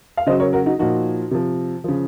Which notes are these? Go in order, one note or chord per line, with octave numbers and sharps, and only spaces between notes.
F5
C#3 F#3 C5 D#5
A#4 C#5
F#4 A#4
D#4 F#4
A#2 F3 D#4 F#4
C3 F3
C#3 F3